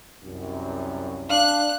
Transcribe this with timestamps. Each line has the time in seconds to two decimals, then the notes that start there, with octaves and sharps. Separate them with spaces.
0.23 C2 F#2
1.30 D4 F5 F#6